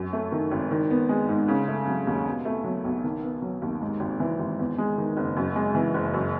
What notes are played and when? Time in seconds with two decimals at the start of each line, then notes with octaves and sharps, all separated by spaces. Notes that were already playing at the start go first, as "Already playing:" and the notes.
Already playing: F#2
0.13 A3
0.32 D#3
0.52 G#1
0.71 D#3
0.90 B3
1.09 G#3
1.29 G#2
1.48 C#3
1.68 A3
1.87 F#3
2.07 D#2
2.27 B2
2.45 A3
2.64 F#3
2.84 B1
3.04 D#3
3.23 B3
3.42 F#3
3.62 D#2
3.81 G#2
4.00 G#1
4.20 E3
4.39 G#1
4.59 E2
4.78 G#3
4.98 D#3
5.17 F#1
5.37 F#2
5.56 G#3
5.75 E3
5.94 F#1
6.14 F#2